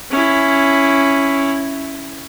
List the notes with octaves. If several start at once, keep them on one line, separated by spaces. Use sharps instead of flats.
C#4 E4